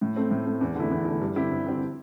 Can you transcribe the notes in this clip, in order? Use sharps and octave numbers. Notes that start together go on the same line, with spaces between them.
A2
A3 C4
A2
A3 C4
E2
D3 A3 E4
E2
D3 A3 E4
G2
D3 C4 E4 G4
G2
D3 C4 E4 G4